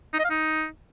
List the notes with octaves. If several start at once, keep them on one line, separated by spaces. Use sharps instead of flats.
D#4
D#5
F5
D#4